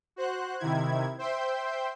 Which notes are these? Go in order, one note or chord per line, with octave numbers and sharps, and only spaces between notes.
F#4 C5 F#6
C3 D#3 E4 G#6
C5 E5 G5 C6 G6